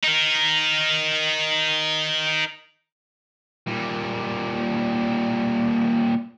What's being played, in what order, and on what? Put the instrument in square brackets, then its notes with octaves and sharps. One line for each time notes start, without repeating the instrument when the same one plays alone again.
[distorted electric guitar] D#4 A#4
A#2 G3